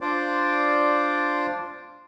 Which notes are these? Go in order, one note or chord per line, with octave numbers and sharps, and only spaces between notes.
D4 F4 C5 D5